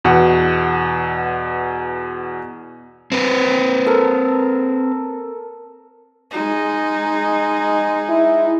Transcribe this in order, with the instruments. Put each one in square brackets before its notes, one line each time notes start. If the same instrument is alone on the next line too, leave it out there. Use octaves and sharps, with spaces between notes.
[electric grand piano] E2 B2 F#5
[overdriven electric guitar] C4 B4
[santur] A4 A#4
[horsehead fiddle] G#3 D#4
[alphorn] E4